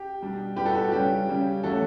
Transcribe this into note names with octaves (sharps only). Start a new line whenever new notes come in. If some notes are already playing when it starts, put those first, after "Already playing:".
Already playing: G4
B2 G3 D4
B2 G3 D4 G4 B4
F#4 A4
G4
F#4
C#3 G3 C#4 G4
C#3 G3 C#4
E3 A3 C#4 F#4 A4